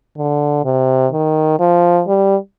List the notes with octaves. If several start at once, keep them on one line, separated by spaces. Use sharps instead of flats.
D3
C3
D#3
F3
G3